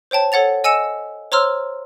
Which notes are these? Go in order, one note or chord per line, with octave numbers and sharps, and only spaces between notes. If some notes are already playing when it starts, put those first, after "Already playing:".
C5 C#5 G5 A5
A4 C#5 F#5 A6 F7
D#5 G#5 E6 C#7 E7
C5 C#5 A#5 C6 E6 F6